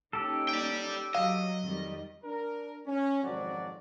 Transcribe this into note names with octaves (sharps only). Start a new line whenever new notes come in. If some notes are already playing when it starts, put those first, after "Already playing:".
A#3 C#4 D#4 G4 A4
D5 G5
F#3 D#5 F5
F2 D#3 G3
D4 A#4
C#4
G#1 F2 F3 F#3 F#4 D5